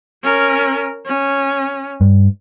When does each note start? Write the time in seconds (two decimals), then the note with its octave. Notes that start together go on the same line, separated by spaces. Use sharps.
0.23 C#4 A#4
1.06 C#4
2.01 G2